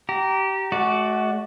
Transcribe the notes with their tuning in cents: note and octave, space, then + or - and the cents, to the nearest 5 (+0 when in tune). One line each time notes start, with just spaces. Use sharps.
G4 -25 A#5 +0
A3 -40 F#4 +5 D5 +0